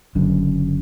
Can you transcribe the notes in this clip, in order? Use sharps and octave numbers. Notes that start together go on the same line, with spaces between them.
F#1 F#2 D3